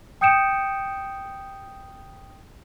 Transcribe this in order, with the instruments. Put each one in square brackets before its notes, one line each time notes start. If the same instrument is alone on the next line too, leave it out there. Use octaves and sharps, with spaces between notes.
[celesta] G5 D#6 G6 C#7 D7 E7